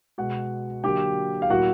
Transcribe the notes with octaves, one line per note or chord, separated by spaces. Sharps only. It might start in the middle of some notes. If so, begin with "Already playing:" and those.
B2 G#3 F#4 F#5
D3 F#3 A#3 G4 G5
F5
A2 F#3 A#3 F#4 F#5